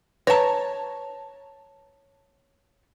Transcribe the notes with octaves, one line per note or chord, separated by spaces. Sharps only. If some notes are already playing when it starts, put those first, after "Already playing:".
B4 C#5 A5 A#5